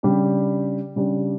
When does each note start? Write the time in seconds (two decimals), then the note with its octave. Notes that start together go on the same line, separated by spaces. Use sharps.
0.03 C#3 G3 D4 G4
0.96 C#3 G3 D4 G4